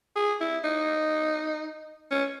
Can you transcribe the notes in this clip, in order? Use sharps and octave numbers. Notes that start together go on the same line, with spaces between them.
G#4
E4
D#4
C#4